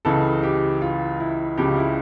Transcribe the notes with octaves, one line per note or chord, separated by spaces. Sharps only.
C#2 C#3 E3 A4
G4
F4
E4
C#2 C#3 F3 G4
E4